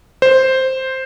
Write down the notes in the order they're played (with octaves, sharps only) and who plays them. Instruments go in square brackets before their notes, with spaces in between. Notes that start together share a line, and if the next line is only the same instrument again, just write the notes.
[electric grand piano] C5